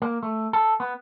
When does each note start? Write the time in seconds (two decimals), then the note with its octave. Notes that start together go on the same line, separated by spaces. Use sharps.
0.02 A#3
0.23 A3
0.53 A4
0.80 B3